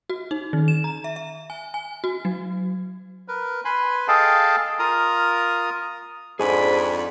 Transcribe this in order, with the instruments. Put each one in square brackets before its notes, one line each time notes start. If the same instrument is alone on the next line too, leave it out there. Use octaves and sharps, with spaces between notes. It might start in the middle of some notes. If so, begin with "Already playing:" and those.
[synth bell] F#4
D#4
D#3
E7
A#5
E5
E5
G#5
G#5
F#4
F#3
[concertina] A#4 B4
B4 G#5 B5 C6
G#4 A4 D#5 F5 G5 A5
F4 A#4 A#5 D#6
[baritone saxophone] F2 [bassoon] G#2 [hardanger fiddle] D4 B5 [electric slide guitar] G#4 G#5